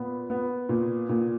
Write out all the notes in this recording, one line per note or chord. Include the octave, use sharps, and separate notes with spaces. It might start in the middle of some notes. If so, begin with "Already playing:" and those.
Already playing: A#2 B3
B3
A#2
A#2